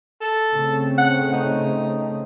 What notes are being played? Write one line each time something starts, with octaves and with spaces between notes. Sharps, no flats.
A4
C#3 A3 C4
F#5
D#4